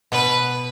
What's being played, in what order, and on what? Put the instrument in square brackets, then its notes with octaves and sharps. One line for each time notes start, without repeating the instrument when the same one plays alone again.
[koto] B2 [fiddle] B4